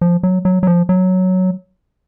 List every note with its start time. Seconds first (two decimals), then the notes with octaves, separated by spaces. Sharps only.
0.01 F3
0.23 F#3
0.45 F#3
0.63 F#3
0.67 F3
0.89 F#3